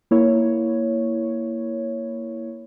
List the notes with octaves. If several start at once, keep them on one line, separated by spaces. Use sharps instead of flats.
A#3 E4 C#5